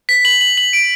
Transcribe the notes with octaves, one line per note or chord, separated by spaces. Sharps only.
B6
F#7
F#7
F#7
D7